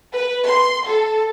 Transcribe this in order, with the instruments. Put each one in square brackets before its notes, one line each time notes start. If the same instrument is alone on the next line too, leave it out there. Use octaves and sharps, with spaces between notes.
[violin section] B4
C6
A4